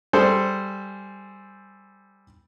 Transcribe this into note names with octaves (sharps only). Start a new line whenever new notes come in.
G3 G#4 A4 C5